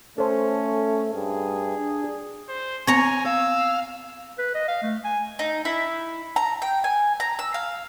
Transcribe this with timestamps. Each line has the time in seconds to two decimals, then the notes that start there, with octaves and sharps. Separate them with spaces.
0.18 A3 C#4 A4 C5
1.14 G2 G#4
1.78 D4
2.49 C5
2.87 B3 C4 C#5 G#5 A#5
3.26 F5 E6
4.39 B4
4.54 D#5
4.68 F5
4.82 A3
5.05 G#5
5.39 D#4
5.65 E4
6.36 A#5
6.62 G5
6.84 G#5
7.20 A#5
7.39 E6
7.54 F5